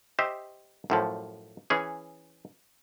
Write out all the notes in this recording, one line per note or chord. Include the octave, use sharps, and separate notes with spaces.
G4 C5 D#5 E5
F#2 A2 F3
E3 C#4 G#4